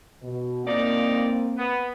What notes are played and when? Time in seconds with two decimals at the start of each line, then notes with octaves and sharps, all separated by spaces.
0.22 B2
0.66 F3 A#3 C4 D#4 D5
1.58 B3